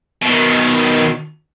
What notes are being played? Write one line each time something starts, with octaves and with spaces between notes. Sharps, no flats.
B2 D#3